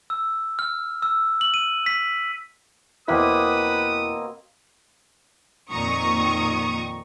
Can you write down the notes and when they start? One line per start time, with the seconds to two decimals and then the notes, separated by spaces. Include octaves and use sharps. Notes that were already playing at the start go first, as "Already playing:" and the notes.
0.10 E6
0.59 F6
1.02 E6
1.41 F#7
1.54 D#7
1.86 B6
3.08 E2 B2 A#3 C4 E4 B4 D#6
5.70 F2 A#2 D#3 A#5 C#6 D#6